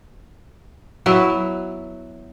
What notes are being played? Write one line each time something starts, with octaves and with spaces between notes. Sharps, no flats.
F#3 B3 E4 B4